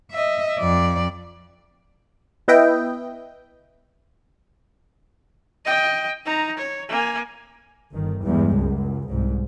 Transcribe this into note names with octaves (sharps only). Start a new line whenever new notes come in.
D#5 E5
F2 D5
B3 E4 B4 D#5 E5 G5
D#5 G5
D#4 A#5
C#5
A#3 G#5
G1 D#3
E2 G2 G3 G#3
C#2 F#2
C2 G#2